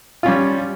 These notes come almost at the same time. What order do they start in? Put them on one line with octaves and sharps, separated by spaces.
F4 C#4 G3